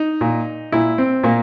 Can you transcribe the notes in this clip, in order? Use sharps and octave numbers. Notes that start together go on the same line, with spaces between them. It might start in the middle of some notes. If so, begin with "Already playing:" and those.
Already playing: D#4
A#2
A#2 E4
C4
A#2 A#3